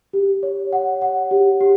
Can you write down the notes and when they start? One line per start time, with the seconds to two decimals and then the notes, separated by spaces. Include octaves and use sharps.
0.13 G4
0.43 C#5
0.73 F#5
1.02 F#5
1.31 G4
1.60 G4